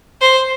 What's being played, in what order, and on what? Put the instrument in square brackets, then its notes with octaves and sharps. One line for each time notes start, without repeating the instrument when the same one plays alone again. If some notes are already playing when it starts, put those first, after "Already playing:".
[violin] C5